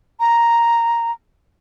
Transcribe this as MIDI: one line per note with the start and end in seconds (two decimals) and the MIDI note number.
0.20 1.11 82